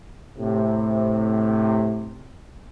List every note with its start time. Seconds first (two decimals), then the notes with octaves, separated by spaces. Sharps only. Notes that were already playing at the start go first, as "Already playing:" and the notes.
0.39 A2 C3